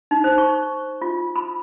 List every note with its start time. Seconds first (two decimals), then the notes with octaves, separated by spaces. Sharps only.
0.11 D#4
0.24 C5
0.38 C#6
1.01 F4
1.36 B5